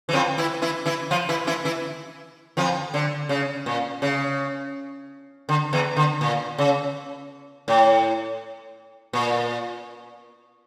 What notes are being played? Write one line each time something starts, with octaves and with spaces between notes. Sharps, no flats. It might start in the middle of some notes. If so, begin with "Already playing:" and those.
E3
F2 F3
E3 E4
E3 E4
E3 E4
F3 F4
E3 E4
E3 E4
E3 E4
F2 F3
D3
C#3
A#2
C#3
D3
E2 E3
D3
A#2
C#3
A2
A#2